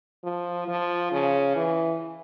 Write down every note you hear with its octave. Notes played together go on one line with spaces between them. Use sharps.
F3
F3
C#3
E3